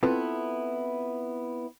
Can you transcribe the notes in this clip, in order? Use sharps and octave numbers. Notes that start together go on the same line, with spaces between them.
B3 C4 E4 F4 A4 B4